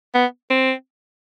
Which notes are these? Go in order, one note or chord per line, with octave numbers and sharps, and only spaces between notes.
B3
C4